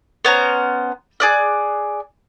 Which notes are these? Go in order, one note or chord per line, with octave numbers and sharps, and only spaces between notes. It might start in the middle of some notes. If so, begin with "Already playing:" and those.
B3 C#4 C5 A#5
G#4 D5 F#6